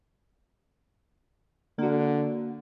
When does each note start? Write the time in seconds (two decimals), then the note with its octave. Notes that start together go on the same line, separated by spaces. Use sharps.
1.79 D3 A#3 F#4